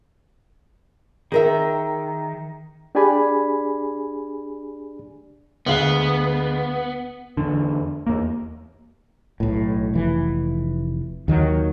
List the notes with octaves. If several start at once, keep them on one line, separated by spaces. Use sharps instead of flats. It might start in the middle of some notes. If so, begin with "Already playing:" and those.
D#3 G#4 A#4 E5
D4 G4 G#4 D5 G#5 B5
D2 G#3 B3 F5
E2 D3
E2 A#3
B1 A2
F1 E3
D#2 D#3 F#3